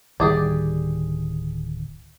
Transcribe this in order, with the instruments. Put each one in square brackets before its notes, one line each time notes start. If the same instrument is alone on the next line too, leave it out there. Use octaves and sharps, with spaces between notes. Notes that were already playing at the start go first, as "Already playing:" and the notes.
[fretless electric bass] D1 D#3 G3 [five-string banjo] G4 G#4 D5